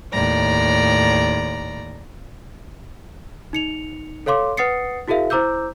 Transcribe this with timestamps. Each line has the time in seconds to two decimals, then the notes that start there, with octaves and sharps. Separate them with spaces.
0.13 D#2 A2 D5 A#5
3.53 D#4 C#7 F7
4.26 A4 C#5 F5 C6 D6
4.57 B4 F#5 D#6 A6 C7 C#7
5.08 E4 F#4 G#4 A#4 E5 F5
5.30 E4 C5 A#5 D6 E6 G6